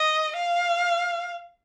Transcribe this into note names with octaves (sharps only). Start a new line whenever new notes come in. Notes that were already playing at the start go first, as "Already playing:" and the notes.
Already playing: D#5
F5